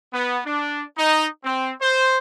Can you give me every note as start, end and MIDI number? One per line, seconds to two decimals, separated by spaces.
0.13 0.39 59
0.45 0.84 62
0.97 1.27 63
1.44 1.73 60
1.81 2.18 72